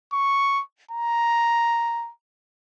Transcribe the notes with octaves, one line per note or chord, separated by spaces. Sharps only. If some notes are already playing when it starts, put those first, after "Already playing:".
C#6
A#5